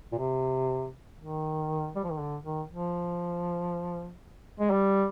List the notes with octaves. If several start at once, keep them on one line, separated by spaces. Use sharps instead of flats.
A#2
C3
D#3
G3
F3
D#3
D3
D#3
F3
G#3
G3